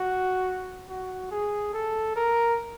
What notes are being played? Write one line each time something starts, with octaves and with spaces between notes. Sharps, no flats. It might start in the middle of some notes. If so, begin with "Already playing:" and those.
Already playing: F#4
F#4
G#4
A4
A#4